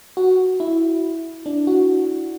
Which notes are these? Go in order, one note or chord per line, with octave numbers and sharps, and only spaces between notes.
F#4
E4
D4
F#4